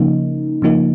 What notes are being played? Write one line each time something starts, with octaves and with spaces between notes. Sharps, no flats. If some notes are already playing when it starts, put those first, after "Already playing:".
Already playing: C#3 F3 A#3 D#4
C#3 F3 A#3 D#4